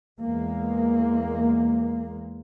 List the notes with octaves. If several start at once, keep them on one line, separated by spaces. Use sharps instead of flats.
E2 G#3 A#3